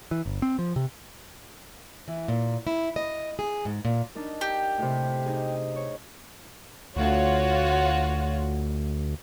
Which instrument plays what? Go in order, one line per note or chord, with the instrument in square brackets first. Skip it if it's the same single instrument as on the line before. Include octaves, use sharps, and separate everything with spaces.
[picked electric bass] E3
G1
C4
F3
C3
[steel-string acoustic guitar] E3
A#2
E4
D#5
G#4
G#2
A#2
[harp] D4 D#4 A#4
[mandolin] G4
[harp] A2 C3
D#4 G#4
C#5
[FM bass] D2 [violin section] F4 F#4 C#5